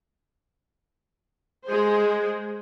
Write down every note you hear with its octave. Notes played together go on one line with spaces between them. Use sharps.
G#3 G#4 C5